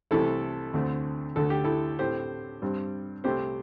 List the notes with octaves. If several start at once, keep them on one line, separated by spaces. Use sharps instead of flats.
C2 C3 E3 A3 E4 A4
D2 D3 A3 C4
D2 D3 A3 A4
G4
E4 A4
A2 A3 C4 G4 C5
G2 G3 C4
C2 C3 A3 C4 G4 C5